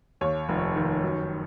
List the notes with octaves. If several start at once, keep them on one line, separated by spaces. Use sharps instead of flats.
D#2 C#5
F1
D#3
F#2